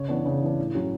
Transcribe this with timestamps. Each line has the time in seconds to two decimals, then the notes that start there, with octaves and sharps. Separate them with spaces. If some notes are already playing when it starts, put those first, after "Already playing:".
Already playing: C#3 C#5
0.08 E3 B3 D4
0.25 C#3
0.42 E3 B3 D4
0.59 A2
0.75 F#3 C#4